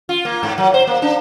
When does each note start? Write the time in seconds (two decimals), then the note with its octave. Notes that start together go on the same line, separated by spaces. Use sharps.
0.09 F4
0.25 A#3
0.43 G#2
0.58 F#3
0.74 C5
0.87 A#3
1.02 D4